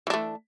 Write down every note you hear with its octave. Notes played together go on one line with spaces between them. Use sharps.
E3 A3 D4